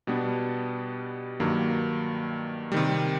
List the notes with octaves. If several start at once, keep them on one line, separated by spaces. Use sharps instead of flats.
B2 G3 B3 D4
G2 D#3 F#3 A#3
C3 D#3 G3